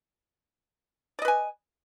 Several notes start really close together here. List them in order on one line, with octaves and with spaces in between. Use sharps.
D5 D#5 B4 G#5